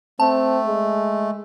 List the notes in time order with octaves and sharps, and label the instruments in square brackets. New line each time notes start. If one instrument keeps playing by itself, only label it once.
[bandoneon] A3 [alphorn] C4 [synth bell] A5
[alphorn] G#3